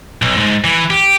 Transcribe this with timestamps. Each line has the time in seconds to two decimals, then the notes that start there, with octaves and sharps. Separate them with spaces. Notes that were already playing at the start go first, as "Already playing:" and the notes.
0.22 B1
0.36 G#2
0.64 E3
0.91 G4